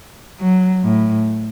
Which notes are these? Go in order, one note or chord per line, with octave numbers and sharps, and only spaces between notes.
F#3
A2